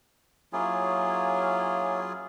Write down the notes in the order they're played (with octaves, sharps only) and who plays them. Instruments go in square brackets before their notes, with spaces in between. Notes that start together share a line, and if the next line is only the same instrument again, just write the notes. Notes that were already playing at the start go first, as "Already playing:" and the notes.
[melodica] F#3 F4 G#4 [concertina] A#3 C#4 E4